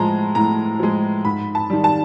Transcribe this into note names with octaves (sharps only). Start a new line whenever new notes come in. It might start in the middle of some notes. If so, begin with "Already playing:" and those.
Already playing: A2 F3 G#3 A5 A#5
A2 A#5
F3 G#3
G#2 B5
A5
D#3 G3
A5